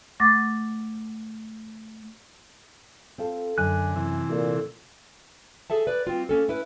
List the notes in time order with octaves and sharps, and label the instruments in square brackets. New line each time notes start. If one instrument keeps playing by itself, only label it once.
[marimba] A3 F#5 C#6 D6 A6 A#6
[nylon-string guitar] C4 F4 A4
[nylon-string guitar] F#2 [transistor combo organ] D3 [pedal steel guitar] G#5 F#6
[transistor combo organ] C3 E3
[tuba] A#2 [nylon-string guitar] A3
[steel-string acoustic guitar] G#4 A4 E5 A5
B4 D5
G3 C4 F4
A#3 C#4 A4
C#4 E4 B4